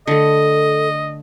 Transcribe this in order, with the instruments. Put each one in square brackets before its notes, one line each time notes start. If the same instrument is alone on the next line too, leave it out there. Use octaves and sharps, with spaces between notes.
[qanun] D3 A3 [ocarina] A4 [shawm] D#5